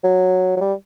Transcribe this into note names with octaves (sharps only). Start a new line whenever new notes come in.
F#3
F#3
G3